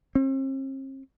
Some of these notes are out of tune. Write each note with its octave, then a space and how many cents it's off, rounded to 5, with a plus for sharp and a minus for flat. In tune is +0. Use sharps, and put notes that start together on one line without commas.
C4 +45